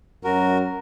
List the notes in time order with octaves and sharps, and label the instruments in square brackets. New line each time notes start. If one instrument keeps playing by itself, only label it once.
[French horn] F#2 [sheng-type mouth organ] F#4 A#4